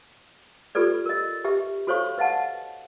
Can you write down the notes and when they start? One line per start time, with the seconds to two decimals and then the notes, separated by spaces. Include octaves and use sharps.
0.75 F4 G4 A4 B4 D5
1.06 A#4 D#5
1.45 G4 B4 E5
1.87 F#4 A4 C5 C#5 F5 C#6
2.18 B4 D#5 F5 F#5 A5